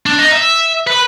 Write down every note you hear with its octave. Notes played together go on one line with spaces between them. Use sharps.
D4
D#4
E5
B4